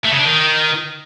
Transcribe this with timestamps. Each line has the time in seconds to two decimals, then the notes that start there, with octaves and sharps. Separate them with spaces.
0.05 A3
0.12 C#3
0.19 D4
0.26 D#3